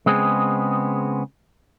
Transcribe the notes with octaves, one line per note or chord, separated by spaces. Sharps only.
C#3 G#3 B3 C4 G#4